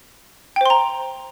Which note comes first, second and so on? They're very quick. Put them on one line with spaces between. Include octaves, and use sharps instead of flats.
G5 C5 C6 A#5